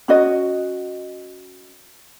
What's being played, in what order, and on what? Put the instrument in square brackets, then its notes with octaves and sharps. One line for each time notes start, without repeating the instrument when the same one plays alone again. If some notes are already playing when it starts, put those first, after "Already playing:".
[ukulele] C#4 F#4 D#5